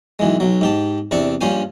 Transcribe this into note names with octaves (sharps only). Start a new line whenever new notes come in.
B1 E3 G#3
B1 F#3
G#2 G4 A5
E2 C3 D4 D5 C#6
A#1 G2 F3 C#4 C5 G#5